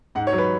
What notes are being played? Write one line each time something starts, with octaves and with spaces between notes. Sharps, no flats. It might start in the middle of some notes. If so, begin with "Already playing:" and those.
G#2 F#5
C#5
F#3
B4